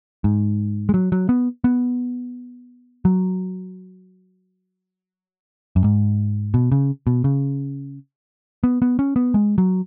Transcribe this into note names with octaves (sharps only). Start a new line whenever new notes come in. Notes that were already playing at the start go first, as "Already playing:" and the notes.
G#2
G#3
F#3
F#3
B3
B3
F#3
F#2
G#2
B2
C#3
B2
C#3
B3
B3
C#4
B3
G#3
F#3